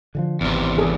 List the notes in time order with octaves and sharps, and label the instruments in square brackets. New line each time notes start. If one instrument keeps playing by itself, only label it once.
[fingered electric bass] D3 E3 F3
[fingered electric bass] G#1 [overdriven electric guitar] E2 C3
[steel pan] G#4 A4